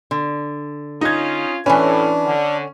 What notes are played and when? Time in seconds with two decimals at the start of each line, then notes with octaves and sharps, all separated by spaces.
0.11 D3
1.01 C#4 D#4 F4 G#6
1.66 A2 E3 C#4 D4 B4
2.24 D3